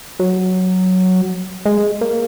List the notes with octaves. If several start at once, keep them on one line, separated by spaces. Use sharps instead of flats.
F#3
G#3
A#3